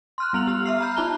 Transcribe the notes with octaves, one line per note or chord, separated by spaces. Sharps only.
C6 F6 F#6
G3 B3 F7 F#7
G4 F6 F7
E5 F6 C7
A#5 B5 F6 G6
D#4 F4 A5 F#6 G7